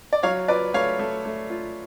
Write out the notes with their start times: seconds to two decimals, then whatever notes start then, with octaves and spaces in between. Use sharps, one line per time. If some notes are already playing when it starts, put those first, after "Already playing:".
0.13 D5
0.23 F#3 C#5 F5
0.48 F4 B4 D5
0.74 A3 C#5 F5
0.99 A3
1.25 A3
1.50 F4